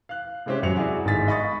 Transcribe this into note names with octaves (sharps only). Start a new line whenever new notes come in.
F5 F#6
C3 G#3 C4 C#4 G4
F#2 F#3 C#7 F7
E4 F#4 G#4 D5 F#5
G1 G#2 D#3 G#4 A6 B6
D#5 B5 C#6 D#6 A6 B6